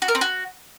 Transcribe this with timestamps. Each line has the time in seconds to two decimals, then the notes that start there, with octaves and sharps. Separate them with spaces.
0.02 F#4
0.08 A#4
0.15 C4
0.21 F#4